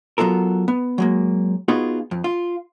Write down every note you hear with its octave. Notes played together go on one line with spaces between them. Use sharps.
F#3 B3 F4 A4 A#4
B3
F#3 G#3 A#3
B3 D#4 F4 F#4 G#4
F2
F4